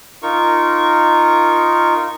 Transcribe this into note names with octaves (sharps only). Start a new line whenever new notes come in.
D#4 F4 A#4 C#6